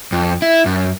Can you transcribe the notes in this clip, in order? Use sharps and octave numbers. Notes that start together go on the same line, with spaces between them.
F2
E4
F#2